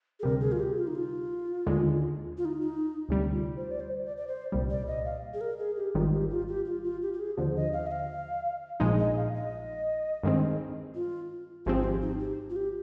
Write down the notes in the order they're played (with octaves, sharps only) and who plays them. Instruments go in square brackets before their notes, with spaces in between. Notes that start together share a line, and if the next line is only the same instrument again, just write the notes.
[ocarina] G#4
[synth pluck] D2 C3 G3 [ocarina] A#4
[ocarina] G#4
F4
G4
F4
D#4
F4
[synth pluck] D#2 D3 G#3
[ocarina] F4
D#4
D#4
[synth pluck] D2 C3 G3
[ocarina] F4
C5
D5
C5
D5
D5
C5
[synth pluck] C2 A#2 G3
[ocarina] D5
D#5
F5
G#4
A#4
G#4
G4
[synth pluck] G#1 G#2 D#3 G3 [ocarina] F4
[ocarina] G4
F4
G4
F4
F4
G4
G4
G#4
[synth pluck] D#2 D3 F3 [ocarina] C5
[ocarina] D#5
F5
D#5
F5
[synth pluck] A#1 A#2 F3 G#3 D#4 [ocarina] D#5
[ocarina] D#5
F5
D#5
[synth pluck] G2 D#3 G#3 C4
[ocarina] F4
[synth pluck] G#1 G#2 F3 G#3 C4 [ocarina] G4
[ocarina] F4
G4
D#4
G4
F4
G4